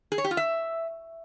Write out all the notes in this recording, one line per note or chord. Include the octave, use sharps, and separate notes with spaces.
G#4
C#5
G4
F4
E5